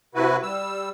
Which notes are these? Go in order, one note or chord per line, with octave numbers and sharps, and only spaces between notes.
C3 E4 F#4 B4
G3 E6